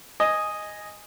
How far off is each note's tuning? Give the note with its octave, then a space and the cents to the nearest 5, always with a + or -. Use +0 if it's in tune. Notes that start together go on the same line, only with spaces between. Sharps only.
D#5 +0 G#5 +0